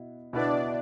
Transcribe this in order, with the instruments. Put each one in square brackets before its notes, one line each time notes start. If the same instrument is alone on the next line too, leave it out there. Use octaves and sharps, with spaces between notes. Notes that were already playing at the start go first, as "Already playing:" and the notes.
Already playing: [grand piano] B2 B3 E4
[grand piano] B2 B3 E4 B4 [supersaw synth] D4 D5